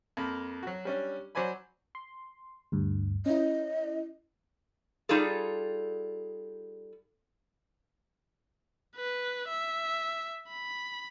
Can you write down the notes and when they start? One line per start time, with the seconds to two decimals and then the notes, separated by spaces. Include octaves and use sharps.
0.17 F2 A#3 B5
0.63 F#3 F#4
0.85 G3 C#4 D4
1.35 F#3 C5 D5 G#5 B5
1.95 C6
2.72 D2 G2
3.26 C#4 E4 D#5
5.09 G3 D#4 F4 G#4 A4
8.96 B4
9.48 E5
10.48 B5